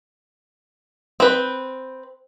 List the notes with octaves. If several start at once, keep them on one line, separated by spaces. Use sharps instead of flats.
C4 B4